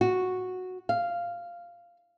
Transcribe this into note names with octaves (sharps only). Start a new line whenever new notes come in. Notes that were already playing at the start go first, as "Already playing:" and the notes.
F#4
F5